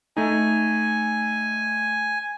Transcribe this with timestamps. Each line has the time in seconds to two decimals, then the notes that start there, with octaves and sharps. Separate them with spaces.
0.17 A3 D#4 G#5